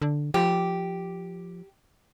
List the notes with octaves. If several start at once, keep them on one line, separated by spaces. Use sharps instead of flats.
D3
F3 G4